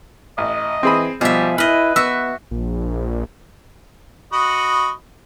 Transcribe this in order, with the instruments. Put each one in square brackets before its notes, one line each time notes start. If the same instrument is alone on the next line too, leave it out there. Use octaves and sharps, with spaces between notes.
[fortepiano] A1 [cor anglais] D#5
[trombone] E3 [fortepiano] C4 G#4 B5
[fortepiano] B2 [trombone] F3 [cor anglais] G3 [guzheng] G#4 E5
[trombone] E4 [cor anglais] B4 [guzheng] D#5 B5 [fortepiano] F6
[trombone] B3 [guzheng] F#4 E5 [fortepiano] E6
[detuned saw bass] A#1
[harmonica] F#4 D#5 B5